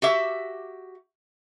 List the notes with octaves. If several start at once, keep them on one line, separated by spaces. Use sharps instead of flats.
F#4 G4 E5